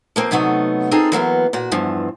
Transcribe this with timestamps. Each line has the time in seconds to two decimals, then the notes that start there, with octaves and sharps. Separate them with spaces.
0.16 F3 A#3 C4
0.31 C3 F#3 A3 B3 D#4
0.91 C4 D#4 F4 G#4 A4
1.12 E3 F#3 A#3 B3
1.53 A#2 F#4
1.71 E2 G2 E3 F3